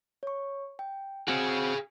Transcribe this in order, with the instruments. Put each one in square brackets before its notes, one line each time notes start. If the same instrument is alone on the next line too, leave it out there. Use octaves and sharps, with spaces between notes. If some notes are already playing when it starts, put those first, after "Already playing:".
[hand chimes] C#5 C#6
G5
[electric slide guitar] C4 F#4 [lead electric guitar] G#4 F5 [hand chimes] C#7 D7